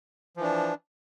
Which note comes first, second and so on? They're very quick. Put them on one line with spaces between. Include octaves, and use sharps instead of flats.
F3 E3 D4